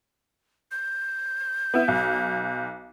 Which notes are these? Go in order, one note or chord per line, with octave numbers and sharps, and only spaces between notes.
G6
B3 E4
B1